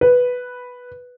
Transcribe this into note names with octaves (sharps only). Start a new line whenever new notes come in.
B4